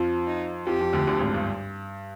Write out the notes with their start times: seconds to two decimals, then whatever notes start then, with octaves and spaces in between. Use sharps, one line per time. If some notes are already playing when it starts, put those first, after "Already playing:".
Already playing: F2 F3
0.27 D#4
0.67 F2 F3 G4
0.80 F2 F3
0.93 D2 D3
1.07 D2 D3
1.20 G#1 G#2
1.34 G2